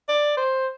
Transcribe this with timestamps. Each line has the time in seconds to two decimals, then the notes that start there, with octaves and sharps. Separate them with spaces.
0.09 D5
0.37 C5